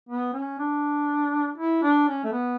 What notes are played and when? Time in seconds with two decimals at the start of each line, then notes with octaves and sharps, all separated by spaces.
0.09 B3
0.34 C#4
0.59 D4
1.58 E4
1.83 D4
2.08 C#4
2.24 A3
2.32 B3